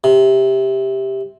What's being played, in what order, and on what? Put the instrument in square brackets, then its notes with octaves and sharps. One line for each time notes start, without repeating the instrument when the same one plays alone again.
[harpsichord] C3